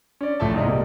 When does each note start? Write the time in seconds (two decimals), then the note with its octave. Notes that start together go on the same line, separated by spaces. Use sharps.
0.21 C#4 D5
0.40 A1 F3 A3 E5 A5
0.54 C2 G#2 D#5
0.68 A#2 G3